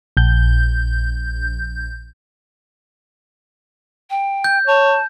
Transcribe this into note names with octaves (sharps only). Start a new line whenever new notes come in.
A#1 G6
G5
G6
C#5 A5